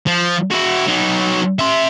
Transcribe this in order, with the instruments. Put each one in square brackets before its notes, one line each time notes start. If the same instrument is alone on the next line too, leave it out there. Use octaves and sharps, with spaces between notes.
[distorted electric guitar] F3
E4 F#4
F#3 D#4
E5 C6